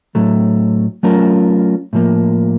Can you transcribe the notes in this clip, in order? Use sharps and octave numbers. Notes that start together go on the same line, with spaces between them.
A2 F#3 A3
F#3 A3 C#4 F4 A#4
A2 F3 A#3